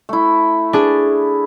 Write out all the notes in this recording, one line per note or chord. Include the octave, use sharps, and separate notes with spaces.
A3 E4
D4 G#4